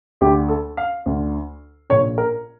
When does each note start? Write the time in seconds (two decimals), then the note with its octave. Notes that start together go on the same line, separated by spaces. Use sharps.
0.21 D2 D3 G4
0.49 A4
0.77 F5
1.06 D2 D3
1.90 A#1 A#2 C#5
2.18 A#4